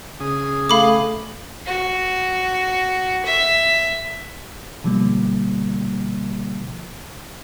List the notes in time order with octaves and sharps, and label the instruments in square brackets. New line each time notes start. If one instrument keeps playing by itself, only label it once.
[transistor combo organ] C#3 G#4 D#6
[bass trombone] A3 [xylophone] F5 B5 D6
[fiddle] F#4
E5
[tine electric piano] B2 D3 F3 G3 A#3